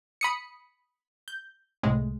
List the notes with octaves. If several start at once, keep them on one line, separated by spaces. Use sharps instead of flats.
B5 D#6 C#7
G6
C2 A2 G#3